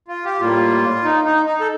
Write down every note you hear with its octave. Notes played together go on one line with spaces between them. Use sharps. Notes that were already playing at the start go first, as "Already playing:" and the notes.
F4
G4
A2 G3 A#3 F4
D#4
D#4
D#4
A4